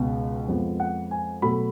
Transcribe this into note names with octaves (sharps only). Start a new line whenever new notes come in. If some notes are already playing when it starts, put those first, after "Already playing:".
Already playing: C#2 B2 G#3 B3
F2 F3 G#3 B3
F#5
G#5
B2 F#3 A3 B5